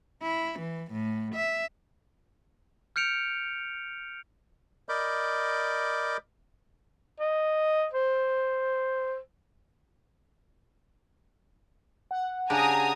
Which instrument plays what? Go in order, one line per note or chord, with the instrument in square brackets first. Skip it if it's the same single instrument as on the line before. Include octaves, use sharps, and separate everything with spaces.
[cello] E4
E3
A2
E5
[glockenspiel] F6 G6 C#7 D7 F7
[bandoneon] A#4 D5 D#5 B5 D6 G6
[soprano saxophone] D#5
C5
[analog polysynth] F#5
[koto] C#3 D4 G4 [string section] G#5 A#5 D#6